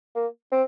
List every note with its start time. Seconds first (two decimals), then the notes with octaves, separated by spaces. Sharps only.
0.16 A#3
0.52 C4